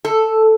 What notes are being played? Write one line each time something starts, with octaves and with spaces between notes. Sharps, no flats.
A4